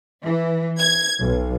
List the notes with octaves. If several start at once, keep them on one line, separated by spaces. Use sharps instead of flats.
E3
G#6
B1